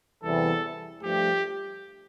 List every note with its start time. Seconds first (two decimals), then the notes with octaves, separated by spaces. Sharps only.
0.24 E2 C3 E3 G3 A4
1.02 G2 F3 A3 G4